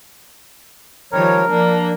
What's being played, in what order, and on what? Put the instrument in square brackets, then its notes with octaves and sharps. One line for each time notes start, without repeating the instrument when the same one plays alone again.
[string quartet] D#3 G3 [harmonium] F3 C#5 [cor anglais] A#4
[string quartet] F3 A#3 [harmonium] D4